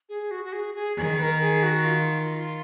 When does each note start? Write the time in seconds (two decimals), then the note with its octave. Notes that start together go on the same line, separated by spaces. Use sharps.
0.09 G#4
0.31 F#4
0.44 F#4
0.53 G#4
0.75 G#4
0.96 D#3 G#4
1.19 B4
1.23 A#4
1.41 G#4
1.63 F#4
1.85 F4